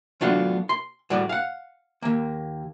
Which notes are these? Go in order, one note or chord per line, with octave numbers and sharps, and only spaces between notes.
F#3 A3 B3 D4 F4
C6
A2 G3 F#4 D5
F5 F#5
D#2 A#3